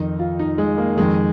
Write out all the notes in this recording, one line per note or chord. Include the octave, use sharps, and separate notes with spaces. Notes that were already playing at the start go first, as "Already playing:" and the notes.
Already playing: F2 D#3 D#4
F4
D#4
G#3
A#3
F2 D#3 G#3